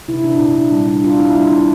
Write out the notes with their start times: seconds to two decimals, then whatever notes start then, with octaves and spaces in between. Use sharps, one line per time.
0.08 C3 E4
0.24 C3 D4
0.39 A#2 E4
0.56 D4
0.72 G3
0.88 D4
1.04 D4 F4
1.20 D4 E4
1.36 G3 D4
1.51 D4 E4